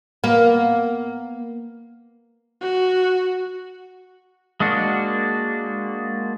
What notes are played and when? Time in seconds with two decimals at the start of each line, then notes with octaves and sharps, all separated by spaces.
0.24 A#3 B3
2.61 F#4
4.60 G#3 A#3 D4 F#4